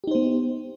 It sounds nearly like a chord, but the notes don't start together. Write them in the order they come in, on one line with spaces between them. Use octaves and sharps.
G4 D#4 C5 B3